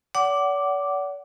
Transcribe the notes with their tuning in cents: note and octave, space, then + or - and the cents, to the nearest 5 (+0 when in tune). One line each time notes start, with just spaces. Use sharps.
D5 -45 F#5 +10 D6 +0